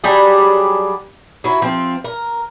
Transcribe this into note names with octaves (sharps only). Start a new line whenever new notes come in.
F#3 G3 D4 G#4
F#3 E4
F3 C4
A#4